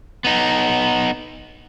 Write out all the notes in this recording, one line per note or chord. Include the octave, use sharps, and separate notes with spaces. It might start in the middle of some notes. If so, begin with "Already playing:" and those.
B3 D#4